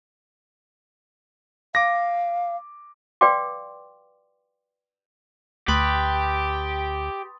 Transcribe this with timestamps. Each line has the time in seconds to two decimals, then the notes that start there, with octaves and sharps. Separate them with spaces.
1.75 F5 D6 A#6
3.21 B4 D5 F5 G5 C6 D6
5.68 D2 G4 B4 C6 D#6 A6